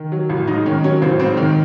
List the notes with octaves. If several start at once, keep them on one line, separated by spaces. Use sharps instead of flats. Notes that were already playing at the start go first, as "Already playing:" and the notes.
Already playing: D#3
F#3
A1
G#2 D#4 D#5
D#3 C#4 C#5
F#3 C#4 C#5
A1 C4 C5
G#2 C4 C5
D#3